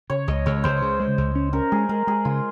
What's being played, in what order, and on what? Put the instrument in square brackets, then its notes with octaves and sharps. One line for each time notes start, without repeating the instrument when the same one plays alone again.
[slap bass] C#3 [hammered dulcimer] C#5
[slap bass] C#2 [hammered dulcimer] D#5
[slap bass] C#2 [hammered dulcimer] C#5
[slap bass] C#2 [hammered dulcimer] C5
[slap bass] C#3
G#3
C#2
C#4
[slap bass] C#4 [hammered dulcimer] A#4
[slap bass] G#3 [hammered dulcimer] G#4
[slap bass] G#3 [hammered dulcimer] A#4
[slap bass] G#3 [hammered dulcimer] G#4
[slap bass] C#3 [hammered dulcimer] F4